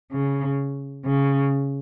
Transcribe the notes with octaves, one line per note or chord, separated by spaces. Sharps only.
C#3
C#3